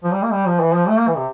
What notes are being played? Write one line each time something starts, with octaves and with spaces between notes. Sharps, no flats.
F3
G3
A#3
G3
F3
E3
F3
A3
A#3
E3
C3